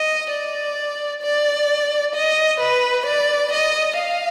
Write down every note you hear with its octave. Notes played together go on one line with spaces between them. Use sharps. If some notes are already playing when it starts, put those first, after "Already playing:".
Already playing: D#5
D5
D5
D#5
B4
D5
D#5
F5